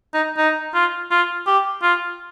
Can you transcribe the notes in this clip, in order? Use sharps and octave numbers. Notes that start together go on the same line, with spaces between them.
D#4
D#4
F4
F4
G4
F4